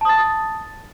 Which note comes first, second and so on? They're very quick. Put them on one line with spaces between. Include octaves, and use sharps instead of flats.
A5 D#6 A6